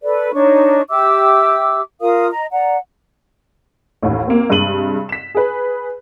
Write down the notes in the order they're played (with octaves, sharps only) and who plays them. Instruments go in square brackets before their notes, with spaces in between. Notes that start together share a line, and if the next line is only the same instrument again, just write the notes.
[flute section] A4 B4 D5
D4 D#4 C#5 C#6
G4 E5 D6 E6
F4 A#4 F5 D#6
D#5 A#5
D5 F#5 A#5
[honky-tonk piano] A1 D#2 A2
A#3 C4
G2 C3 G#3 D#7 F#7
B6 E7
G#4 B4